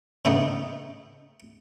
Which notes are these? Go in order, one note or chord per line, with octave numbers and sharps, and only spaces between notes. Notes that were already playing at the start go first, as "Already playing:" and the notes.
A2 C#3 A3 B3 D4 D#4